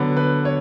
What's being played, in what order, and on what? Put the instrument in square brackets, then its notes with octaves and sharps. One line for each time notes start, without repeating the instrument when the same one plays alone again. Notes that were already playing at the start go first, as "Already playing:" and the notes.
Already playing: [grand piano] D3 F#3 B3
B4
C#5